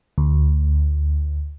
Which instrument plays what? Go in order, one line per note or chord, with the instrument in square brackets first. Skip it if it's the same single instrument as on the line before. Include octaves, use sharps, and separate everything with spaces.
[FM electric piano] D2